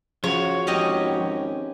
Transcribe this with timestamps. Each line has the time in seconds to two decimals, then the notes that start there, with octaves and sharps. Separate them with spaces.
0.24 C#3 F3 F#4 C#5
0.67 G#1 C#4 G4 D#5